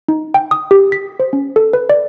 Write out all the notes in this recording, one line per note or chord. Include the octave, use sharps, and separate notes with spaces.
D#4
G5
D#6
G4
B6
C5
C#4
A4
B4
D5